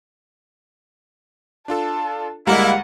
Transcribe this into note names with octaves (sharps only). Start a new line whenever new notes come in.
D4 F4 A4 A5
D2 G3 G#3 A#3 E4 F5 F#5 A#5